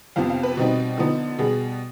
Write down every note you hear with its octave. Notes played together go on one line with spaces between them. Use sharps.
F2 C3 F3 B3 F5
F5
B4
B2 G3 C4 D#4
D3 F3 B3 D#4
B2 G3 B3 G#4